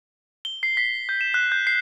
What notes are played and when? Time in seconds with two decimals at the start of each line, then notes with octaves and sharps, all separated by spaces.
0.45 G7
0.63 C7
0.77 B6
1.09 G6
1.21 E7
1.34 F#6
1.52 G6
1.67 C7